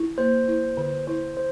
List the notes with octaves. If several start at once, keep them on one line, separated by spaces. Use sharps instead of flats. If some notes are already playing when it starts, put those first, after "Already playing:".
Already playing: D3 E4
A#3 C5
E4
D3
E4 C5
C5